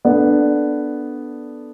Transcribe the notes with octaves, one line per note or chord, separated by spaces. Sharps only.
B3 D4 A4 D5